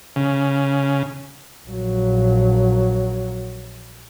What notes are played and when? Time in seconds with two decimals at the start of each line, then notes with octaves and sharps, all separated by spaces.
0.16 C#3
1.67 A#1 F#3